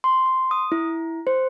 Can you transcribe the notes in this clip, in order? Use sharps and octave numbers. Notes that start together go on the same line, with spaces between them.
C6
C6
D#6
E4
C5